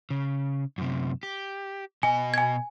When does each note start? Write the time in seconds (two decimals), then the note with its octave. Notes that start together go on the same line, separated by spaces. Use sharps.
0.10 C#3
0.78 F#2 C3
1.23 G4
2.03 B2 D#5 G#5
2.34 G#5 G#6